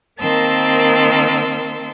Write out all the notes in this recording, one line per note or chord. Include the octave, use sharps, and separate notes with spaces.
D#3 A#3 C4 A5 C6 E6